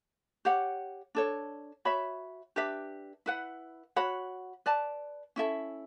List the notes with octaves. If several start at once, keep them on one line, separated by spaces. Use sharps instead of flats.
G4 C#5 F#5
D4 A4 C#5
F#4 C#5 E5 B5
D4 G4 B4 E5
E4 B4 F#5
F#4 C#5 F#5 B5
B4 D5 A5
C#4 E4 A4 E5